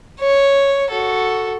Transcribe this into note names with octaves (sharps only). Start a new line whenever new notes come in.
C#5
F#4 A4